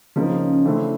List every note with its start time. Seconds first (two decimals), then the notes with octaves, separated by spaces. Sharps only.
0.16 C#3 F3 A#3 C4 D#4
0.40 C#4
0.65 C#3 E3 A3 C4 D4